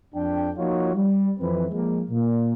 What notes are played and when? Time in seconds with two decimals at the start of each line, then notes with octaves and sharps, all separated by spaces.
0.14 F2 D4 G5
0.57 F3 A#3 D#4 F4 F#4 C#5
0.94 G3
1.39 F2 E3 C4 B4
1.70 F3 G#3 A#3
2.09 A#2